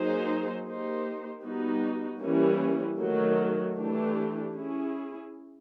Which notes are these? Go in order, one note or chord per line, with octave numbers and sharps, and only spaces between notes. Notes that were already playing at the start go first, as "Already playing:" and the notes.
Already playing: F#3 A#3 D#4 G#4 C5
A#3 D#4 G4 C5
G3 B3 D#4 F#4
E3 G3 A#3 C#4
D#3 F#3 A3
E3 A3 D4 G4
C#4 E4 G#4